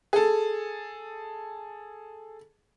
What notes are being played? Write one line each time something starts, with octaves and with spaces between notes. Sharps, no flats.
G#4 A4